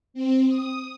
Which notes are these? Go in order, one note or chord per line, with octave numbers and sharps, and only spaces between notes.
C4
D#6